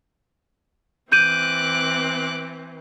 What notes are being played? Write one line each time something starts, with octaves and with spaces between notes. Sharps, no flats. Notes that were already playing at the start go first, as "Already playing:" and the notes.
E3 C4 D6 F#6 G6 D#7